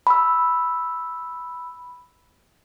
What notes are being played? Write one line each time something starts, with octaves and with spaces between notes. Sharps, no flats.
B5 E6